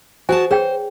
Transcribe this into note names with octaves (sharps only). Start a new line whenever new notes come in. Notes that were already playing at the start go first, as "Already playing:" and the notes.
F#4 G#4 C5 G#5 A5
G#4 C5 C#5 G5